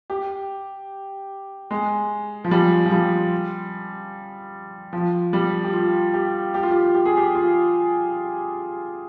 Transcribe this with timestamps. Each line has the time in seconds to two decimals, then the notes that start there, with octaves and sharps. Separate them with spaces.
0.10 G4
1.71 G#3
2.44 F3
2.51 G3
2.85 F3
2.91 G3
4.93 F3
5.33 G3
5.64 G4
5.73 F4
6.14 G4
6.54 G4
6.63 F4
6.71 G4
6.95 G4
7.06 G#4
7.17 G4
7.35 F4